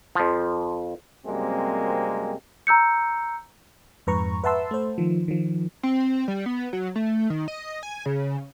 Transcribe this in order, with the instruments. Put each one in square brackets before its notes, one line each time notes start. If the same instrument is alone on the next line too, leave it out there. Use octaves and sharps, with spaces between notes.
[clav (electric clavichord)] F2 F3
[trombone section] F#2 C3 G3 G#3 A#3 C4
[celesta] A#5 E6 G6 C#7
[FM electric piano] F2 G#2 B4 A#5 C#6
B4 E5 F#5 A5 C6 E6
A3 C5
D#3 F3
D#3 F3
[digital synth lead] C4
G3
B3
F#3
A3
D#3
D#5
G#5
C#3